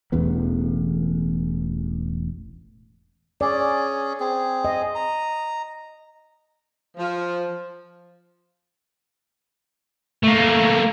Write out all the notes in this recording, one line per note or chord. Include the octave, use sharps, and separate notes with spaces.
E1 A1 E2 B3
C#4 G#4 D5
C4 G#4
D#5
A#5
F3
A3 A#3